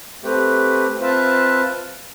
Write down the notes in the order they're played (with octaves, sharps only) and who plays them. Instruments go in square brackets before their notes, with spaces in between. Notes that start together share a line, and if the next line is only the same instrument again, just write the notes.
[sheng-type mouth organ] A3 C4 G4 B4
C4 F4 B4 E5 A5